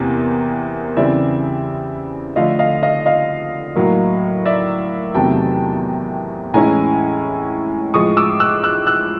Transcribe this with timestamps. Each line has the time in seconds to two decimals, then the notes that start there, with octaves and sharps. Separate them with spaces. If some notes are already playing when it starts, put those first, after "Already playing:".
Already playing: E2 C3 A#3
0.97 C#3 E3 G3 C4 D5 E5
2.36 D3 F3 A3 D#5 F5
2.59 D#5 F5
2.83 D#5 F5
3.06 D#5 F5
3.76 A2 F#3 A#3
4.45 D5 E5
5.14 E2 C3 D#3 F#3 A3 G5 A5
6.54 A2 E3 G#3 C#4 E4 G#5 A#5
7.94 A2 F3 G#3 C#6 D#6
8.17 D6 E6
8.40 E6 F#6
8.64 E6 F#6
8.87 E6 F#6